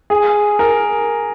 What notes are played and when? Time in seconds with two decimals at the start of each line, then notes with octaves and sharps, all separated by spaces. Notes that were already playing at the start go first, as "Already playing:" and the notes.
0.10 G#4
0.59 A#4